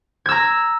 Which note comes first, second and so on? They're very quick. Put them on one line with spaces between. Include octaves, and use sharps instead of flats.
G#6 E6 A#5